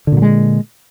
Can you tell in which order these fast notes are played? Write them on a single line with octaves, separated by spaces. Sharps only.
D3 A#2 F#3 G#3